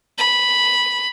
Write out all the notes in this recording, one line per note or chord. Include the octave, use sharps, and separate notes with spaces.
B5